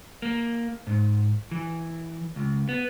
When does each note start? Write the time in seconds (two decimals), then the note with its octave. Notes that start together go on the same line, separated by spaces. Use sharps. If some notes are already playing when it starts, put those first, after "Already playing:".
0.22 A#3
0.87 G#2
1.51 E3
2.36 C#2
2.69 B3